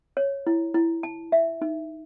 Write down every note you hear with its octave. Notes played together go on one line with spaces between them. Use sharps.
C#5
E4
E4
A5
E5
D#4